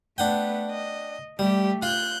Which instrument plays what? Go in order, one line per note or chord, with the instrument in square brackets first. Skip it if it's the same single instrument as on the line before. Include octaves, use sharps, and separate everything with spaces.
[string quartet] A3 B3 [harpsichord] D4 F#5 G5
[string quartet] D#5
[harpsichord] G3 [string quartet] A3 G4
[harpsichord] F4 [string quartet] F#6 G6